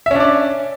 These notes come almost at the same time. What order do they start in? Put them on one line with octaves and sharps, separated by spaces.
E5 C#4 D4 D5